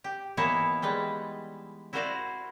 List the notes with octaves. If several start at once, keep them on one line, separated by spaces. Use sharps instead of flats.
G4
E3 A#3 B3 D#4 E4 C#5
G3 G#3 B4
E4 F#4 A#4 C5 D5 F5